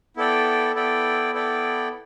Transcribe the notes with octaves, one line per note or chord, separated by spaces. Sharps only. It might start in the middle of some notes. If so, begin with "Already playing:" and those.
B3 E4 A4 D5 G5
B3 E4 A4 D5 G5
B3 E4 A4 D5 G5